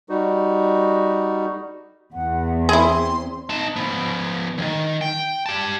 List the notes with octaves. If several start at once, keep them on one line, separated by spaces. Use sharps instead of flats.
G3 D#4 F#4
E2 F#5
C4 E4 G#4 C6
D#4 A5
F3 B3
D2 D#3
G5
G4 A5